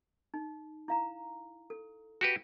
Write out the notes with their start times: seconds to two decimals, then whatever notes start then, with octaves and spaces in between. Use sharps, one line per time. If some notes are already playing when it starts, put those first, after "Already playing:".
0.34 D#4
0.88 E4 F5 A#5
1.70 A4
2.21 F#4 G4 B4